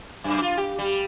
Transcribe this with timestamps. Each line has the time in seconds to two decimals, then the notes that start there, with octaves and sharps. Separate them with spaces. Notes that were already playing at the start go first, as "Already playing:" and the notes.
0.24 F#2
0.42 F4
0.57 G4
0.79 G3